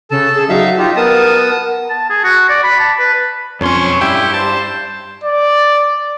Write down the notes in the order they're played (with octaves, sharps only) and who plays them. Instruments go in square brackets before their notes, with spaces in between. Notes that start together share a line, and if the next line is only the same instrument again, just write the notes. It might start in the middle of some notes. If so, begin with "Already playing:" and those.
[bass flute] C#3 [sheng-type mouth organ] A4 A5
[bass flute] G#4
[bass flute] F#3 [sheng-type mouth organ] D#4 E5 F5
[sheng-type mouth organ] D#4 F4 G4
[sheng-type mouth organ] B3 A5 D#6 [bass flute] A#4
[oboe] A5
G#4
F#4
D5
B5
A5
B4
[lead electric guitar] B1 C6 [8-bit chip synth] F2 C#4 [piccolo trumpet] C#5
[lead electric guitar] G2 [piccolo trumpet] E4 [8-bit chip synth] G4 G5
[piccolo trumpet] C5 [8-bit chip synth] A5
[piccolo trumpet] D5